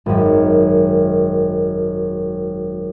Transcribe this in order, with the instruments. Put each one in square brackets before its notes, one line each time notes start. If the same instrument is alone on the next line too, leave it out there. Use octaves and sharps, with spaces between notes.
[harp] G#1 F#2